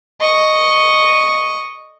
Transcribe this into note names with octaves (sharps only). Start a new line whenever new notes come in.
D#5 C#6